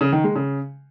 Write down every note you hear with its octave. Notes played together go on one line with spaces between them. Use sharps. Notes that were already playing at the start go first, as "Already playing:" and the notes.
C#3
D#3
G#3
C#3